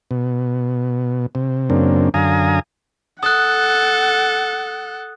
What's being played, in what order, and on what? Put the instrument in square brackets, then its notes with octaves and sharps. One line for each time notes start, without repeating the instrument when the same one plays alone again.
[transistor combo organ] B2
C3
F#2 C#3 A#3 C4 D4
F#2 D3 F5 G#5 A#5 D#6
[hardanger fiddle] A4 [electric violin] F#5 [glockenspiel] D#6 F#6